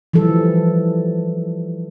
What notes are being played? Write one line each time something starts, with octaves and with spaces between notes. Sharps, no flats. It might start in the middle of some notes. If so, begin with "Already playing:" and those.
E3 F3 G3 A4